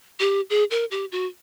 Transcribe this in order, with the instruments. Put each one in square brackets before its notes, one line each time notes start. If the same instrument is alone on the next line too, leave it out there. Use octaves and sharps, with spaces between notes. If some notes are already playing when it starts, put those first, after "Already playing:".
[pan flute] G4
G#4
A#4
G4
F#4